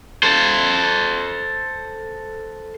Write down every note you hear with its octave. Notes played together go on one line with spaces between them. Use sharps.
A4 C5